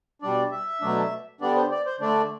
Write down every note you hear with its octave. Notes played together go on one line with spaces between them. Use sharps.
B2 G3 D4 D5
E5
B2 F#3 A3 D4
D3 G3 B3 D4 D5
C5
D5
C5
D3 A3 D4 D5